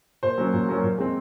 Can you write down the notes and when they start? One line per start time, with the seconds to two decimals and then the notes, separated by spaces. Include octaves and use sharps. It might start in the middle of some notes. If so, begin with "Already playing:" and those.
0.23 A#2 C5
0.38 F#3 A#3 C#4
0.54 A#2
0.69 F#3 A#3 C#4
0.83 A#2
0.98 G#3 C4